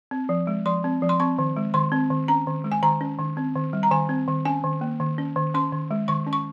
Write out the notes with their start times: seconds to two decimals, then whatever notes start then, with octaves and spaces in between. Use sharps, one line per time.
0.11 C4
0.29 F3
0.47 G#3
0.66 F3 C6
0.84 C4
1.02 F3
1.09 C6
1.20 C4 C#6
1.39 D#3
1.56 G#3
1.74 D#3 C6
1.92 C4
2.10 D#3
2.28 C#4 A#5
2.47 D#3
2.64 G#3
2.72 G#5
2.82 D#3 A#5
3.01 C#4
3.19 D#3
3.37 C4
3.56 D#3
3.73 G3
3.83 A#5
3.91 D#3 G#5
4.09 C4
4.28 D#3
4.45 C#4 G#5
4.64 D#3
4.81 A#3
5.00 D#3
5.18 C#4
5.36 D#3
5.54 C#4 C6
5.72 D#3
5.91 G#3
6.08 D#3 C#6
6.27 C#4
6.33 C#6